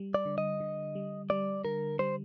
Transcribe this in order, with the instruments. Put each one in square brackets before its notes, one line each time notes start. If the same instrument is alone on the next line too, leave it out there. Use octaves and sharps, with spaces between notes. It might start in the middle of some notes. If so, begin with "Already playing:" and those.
Already playing: [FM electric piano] G3
[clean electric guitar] D5
[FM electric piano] D3
[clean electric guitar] D#5
[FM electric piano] D3
G3
[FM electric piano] G3 [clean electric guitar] D5
[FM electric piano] D3 [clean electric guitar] A#4
[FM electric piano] G3 [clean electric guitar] C5